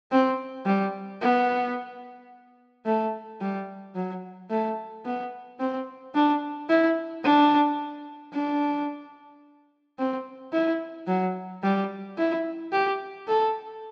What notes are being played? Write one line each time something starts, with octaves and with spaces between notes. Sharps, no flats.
C4
G3
B3
A3
G3
F#3
A3
B3
C4
D4
E4
D4
D4
C4
E4
F#3
G3
E4
G4
A4